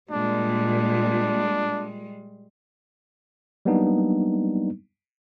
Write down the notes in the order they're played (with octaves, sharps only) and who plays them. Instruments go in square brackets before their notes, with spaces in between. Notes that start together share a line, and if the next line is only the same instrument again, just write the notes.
[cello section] A#2 [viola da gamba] G3 G#3 [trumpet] D4
[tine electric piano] F#3 G3 A#3 B3 D4 D#4